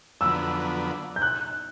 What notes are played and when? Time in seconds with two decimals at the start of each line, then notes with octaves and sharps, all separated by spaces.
0.21 F2 D3 F#3 B3 E6
1.16 G6
1.22 F#6